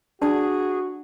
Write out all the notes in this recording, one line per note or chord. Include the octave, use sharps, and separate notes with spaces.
D4 F#4 G#4 D5 A5